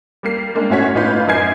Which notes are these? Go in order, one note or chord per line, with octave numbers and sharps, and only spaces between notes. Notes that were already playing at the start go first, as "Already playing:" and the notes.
G3 A#3 C7
G#3 A#3 D4
G1 A2 C#4 F#4 C#5 B6
A1 D#4 F4 B4 F5 G6
F#2 D#4 A#4 G#5 G#6 C7